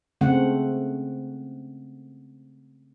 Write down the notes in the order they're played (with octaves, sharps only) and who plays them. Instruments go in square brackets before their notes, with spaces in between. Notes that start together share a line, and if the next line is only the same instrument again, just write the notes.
[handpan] C#3 A3 C4 F#5